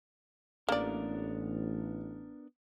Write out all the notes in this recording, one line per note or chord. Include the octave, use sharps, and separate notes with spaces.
A1 A#3 B3 D4 A#4 D5